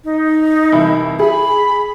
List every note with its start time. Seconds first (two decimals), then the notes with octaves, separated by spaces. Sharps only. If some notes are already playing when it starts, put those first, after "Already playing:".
0.04 D#4
0.72 C2 E3 E4
1.19 G#4 B5